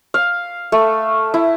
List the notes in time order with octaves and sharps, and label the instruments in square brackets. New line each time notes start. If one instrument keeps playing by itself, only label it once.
[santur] F5
A3
E4